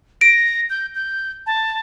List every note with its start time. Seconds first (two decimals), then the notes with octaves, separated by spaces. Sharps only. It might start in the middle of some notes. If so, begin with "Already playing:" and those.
0.21 A#6 D7
0.70 G6
0.95 G6
1.46 A5